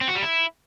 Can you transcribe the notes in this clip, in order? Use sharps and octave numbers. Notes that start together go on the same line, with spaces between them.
C4
F#4
G3
E4